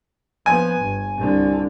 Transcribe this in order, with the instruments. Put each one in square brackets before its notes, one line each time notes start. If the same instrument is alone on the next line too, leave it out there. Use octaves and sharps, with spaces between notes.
[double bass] F3 B3 [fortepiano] G#5
[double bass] G1
C2 D3